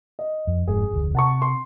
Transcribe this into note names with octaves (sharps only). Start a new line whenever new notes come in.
D#5
F2
F1 G#2 G#4
F1 D2
C3 F#5 A5 C#6
C6